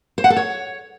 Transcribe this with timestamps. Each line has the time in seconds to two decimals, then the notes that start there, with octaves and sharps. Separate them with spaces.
0.18 C5
0.24 F#5
0.30 A4
0.36 C#5